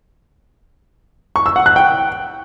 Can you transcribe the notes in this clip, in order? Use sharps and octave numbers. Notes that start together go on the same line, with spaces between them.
C#6
E6
F#5
F#6
G5